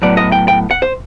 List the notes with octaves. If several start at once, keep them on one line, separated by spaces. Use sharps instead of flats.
A2 F#3 B3 D5
D#5
G5
G5
F#5
C5